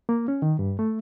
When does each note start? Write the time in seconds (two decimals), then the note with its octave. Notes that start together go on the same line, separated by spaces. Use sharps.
0.09 A#3
0.28 C#4
0.42 D#3
0.59 G2
0.79 A3